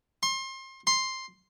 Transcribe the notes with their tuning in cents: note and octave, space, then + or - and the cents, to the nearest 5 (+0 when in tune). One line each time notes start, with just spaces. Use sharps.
C6 +30
C6 +5